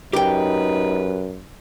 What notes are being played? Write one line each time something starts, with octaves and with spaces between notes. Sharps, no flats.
F#2 D#4 G4 B4 G5